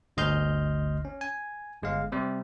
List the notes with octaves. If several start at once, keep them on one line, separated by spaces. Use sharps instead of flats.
G1 D2 D#5 C6 F6 G6
C#4
G#5
G1 G#3 F5
C3 G3